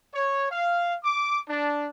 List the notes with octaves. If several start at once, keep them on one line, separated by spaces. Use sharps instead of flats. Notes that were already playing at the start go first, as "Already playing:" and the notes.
C#5
F5
D6
D4